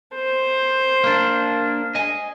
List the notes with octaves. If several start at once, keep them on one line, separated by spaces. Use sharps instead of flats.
C5
A#3 D4
D#5 G#5